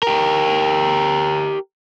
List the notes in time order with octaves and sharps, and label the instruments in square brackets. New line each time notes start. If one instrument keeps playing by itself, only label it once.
[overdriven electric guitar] G4 A#4